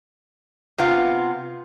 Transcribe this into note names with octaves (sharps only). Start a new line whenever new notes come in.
C3 B3 F4 F5